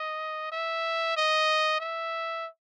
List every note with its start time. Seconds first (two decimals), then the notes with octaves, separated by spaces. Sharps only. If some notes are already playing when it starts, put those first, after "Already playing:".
Already playing: D#5
0.52 E5
1.17 D#5
1.80 E5